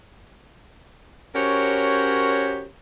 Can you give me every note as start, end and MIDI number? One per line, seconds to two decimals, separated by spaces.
1.35 2.66 61
1.35 2.66 66
1.35 2.66 67
1.35 2.66 70
1.35 2.66 72
1.35 2.66 73